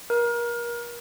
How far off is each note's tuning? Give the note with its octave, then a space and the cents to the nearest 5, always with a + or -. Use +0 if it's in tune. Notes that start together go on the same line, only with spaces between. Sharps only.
A#4 +30